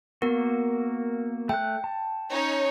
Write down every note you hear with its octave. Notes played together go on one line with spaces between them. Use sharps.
A#3 B3 F#4 A#4
A3 G5 F#6
A5
C#4 D#4 C#5